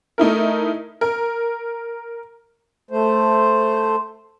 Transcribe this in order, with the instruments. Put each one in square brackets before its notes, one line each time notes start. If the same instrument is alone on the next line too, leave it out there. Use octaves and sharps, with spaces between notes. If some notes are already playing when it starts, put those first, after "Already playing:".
[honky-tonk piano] A3 D#4 E4 A#4
A#4
[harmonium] A3 C5